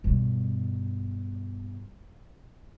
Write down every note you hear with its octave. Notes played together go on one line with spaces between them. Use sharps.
G2 B2